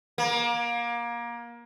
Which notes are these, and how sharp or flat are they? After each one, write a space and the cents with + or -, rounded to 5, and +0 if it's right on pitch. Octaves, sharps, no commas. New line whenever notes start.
A#3 +25